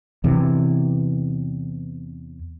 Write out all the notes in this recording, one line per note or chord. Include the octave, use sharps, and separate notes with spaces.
E2 C3 E3